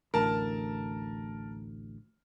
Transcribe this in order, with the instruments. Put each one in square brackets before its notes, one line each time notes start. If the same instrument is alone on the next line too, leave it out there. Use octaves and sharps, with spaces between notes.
[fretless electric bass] A1 D2 [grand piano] A#4 A5